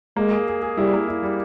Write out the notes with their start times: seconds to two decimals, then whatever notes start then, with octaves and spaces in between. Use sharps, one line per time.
0.17 G#3 A#3
0.32 G#4
0.47 G#4
0.62 G#4
0.77 G3 E4
0.93 A#3
1.08 E4
1.23 G3